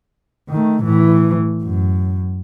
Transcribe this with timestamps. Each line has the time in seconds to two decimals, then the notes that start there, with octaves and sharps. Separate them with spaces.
0.49 D#3 A3
0.83 A2 E3
1.63 F#2